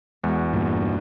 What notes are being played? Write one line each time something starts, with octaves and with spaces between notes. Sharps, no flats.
E2 G#3 F#4
G2 A#2